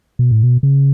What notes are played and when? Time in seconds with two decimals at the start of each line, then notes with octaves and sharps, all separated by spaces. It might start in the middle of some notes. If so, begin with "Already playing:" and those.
0.19 B2
0.31 A2
0.43 B2
0.63 C#3